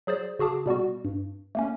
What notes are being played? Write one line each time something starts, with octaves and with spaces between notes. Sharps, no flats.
F#3 G#4 C5 D5
C#3 F#4 G#4 A5 D6
B2 G3 B3 F#4
G2
A3 A#3 C#4